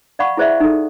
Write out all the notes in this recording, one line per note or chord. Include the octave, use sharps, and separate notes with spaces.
D5 F5 F#5 B5 C#6
E4 G#4 C5 D5 E5
D#4 A4